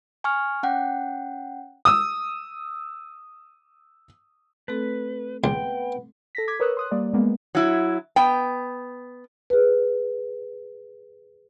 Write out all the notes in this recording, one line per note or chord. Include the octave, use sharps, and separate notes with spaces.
G#5 C#6 F6
C#4 F#5 G5
D#6 E6
A3 C4 A4 B4
C#2 B3 G5
A4 A#6 B6
D6 G#6 B6
A#4 B4 C#5 D#6 E6 F#6
C6 D#6 F#6
G3 A#3 D5
G#3 A#3 B3
F#3 E4
B3 G5
G#4 B4